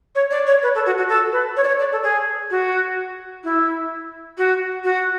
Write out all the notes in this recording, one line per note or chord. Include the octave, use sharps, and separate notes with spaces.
C#5
D5
C#5
B4
A4
F#4
F#4
A4
B4
C#5
D5
C#5
D5
A4
G#4
F#4
E4
F#4
F#4